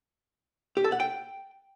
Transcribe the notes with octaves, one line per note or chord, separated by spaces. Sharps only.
G4
A4
F#5
G5